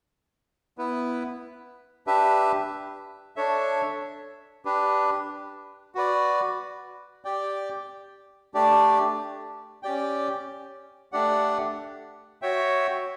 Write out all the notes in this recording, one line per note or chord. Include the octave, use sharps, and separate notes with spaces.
B3 E4 B4
D4 G4 B4 E5
D4 A4 C#5 E5
D4 G4 B4
F#4 B4 D5
G4 D5 G5
A3 D4 G4 D5
C#4 G4 D5 G5
A3 D4 G4 D5 F#5
F#4 C#5 E5 G5